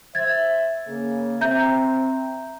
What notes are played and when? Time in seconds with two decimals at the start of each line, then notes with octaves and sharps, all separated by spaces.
0.15 C5 E5 G#6 A6
0.87 C#3 A#3 G#4
1.41 C4 E5 A#5 G6